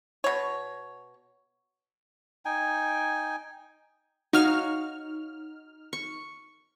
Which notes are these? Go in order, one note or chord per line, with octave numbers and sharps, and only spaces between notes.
B2 C#5
D#4 G5 G#5
D#4 F#4 C#5 F5 F6
C#6